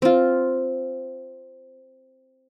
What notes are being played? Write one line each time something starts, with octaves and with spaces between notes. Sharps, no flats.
C4 F4